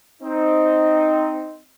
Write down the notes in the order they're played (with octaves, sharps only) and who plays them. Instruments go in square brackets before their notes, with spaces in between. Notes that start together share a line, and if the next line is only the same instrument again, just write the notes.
[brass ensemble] C4 D#4